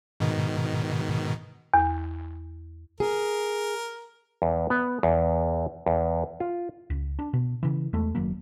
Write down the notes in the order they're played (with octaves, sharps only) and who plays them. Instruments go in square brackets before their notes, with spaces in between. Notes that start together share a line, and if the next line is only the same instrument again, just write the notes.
[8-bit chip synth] G#2 B2 D#3
[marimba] E2
[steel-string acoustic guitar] G#4 [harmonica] A#4
[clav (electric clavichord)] E2
B3
E2
E2
F4
[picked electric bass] C#2
D4
B2
C#3 E3
E2 G#3 A3
F#1 D#3 F#3 A#3